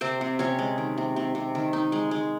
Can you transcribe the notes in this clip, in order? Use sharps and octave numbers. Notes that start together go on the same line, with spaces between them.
C3 C4 C5
C3
C3 C#4 C#5
G#3
D#3
C3
C3
C3
D#3
D#4
G#3
G#3